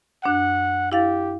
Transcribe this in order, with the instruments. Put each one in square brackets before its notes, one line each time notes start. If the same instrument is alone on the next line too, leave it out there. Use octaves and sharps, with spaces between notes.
[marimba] F#2 D4 F#6 [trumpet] F#5
[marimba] E4 F5 A6 [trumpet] G4